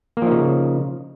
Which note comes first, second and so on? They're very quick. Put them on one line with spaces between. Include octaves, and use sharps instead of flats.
A#3 F3 D#4 C#3